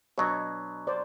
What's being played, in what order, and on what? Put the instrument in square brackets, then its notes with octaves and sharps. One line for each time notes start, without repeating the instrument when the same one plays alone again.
[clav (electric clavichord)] B2 F#3 B3 D4 [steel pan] C#5 D#5
[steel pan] C5 D5